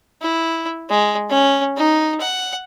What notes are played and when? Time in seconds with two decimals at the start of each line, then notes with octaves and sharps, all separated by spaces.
0.22 E4
0.89 G#3
1.30 C#4
1.77 D#4
2.20 F#5